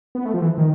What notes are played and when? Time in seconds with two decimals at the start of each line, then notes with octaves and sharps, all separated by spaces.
0.15 B3
0.25 A3
0.34 F3
0.42 E3
0.58 D#3